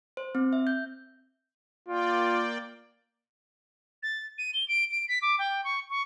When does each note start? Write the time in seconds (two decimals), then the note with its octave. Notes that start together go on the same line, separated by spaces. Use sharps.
0.17 C5
0.35 C4
0.53 E5
0.67 G6
1.89 A#3 F4 D5 G5
4.03 A6
4.38 D#7
4.54 G7
4.68 D7
4.91 D7
5.08 B6
5.22 D6
5.39 G5
5.64 C#6
5.90 C#6